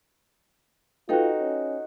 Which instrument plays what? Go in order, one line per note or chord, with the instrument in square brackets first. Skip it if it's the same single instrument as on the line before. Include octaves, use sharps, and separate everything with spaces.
[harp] D#4 F#4 [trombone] F4 [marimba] A4 B4 G5
[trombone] C#4